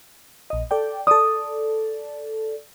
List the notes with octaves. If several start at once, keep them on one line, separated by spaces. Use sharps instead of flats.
A#1 D#5
A4 D5 G5
A4 D5 D#6